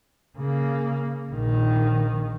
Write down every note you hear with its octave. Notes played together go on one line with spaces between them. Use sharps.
C#3 A#3
A#1 D#3